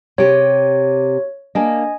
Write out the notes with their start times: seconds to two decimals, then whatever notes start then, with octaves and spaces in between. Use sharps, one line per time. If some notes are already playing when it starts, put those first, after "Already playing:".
0.18 C3 G4 C#5
1.55 A#3 D4 D#5 G#5